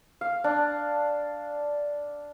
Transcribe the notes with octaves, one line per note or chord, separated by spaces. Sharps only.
F5
D4